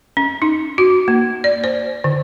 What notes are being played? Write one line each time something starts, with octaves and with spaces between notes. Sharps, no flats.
C#4
D#4
F#4
A#3
D5
C5
D3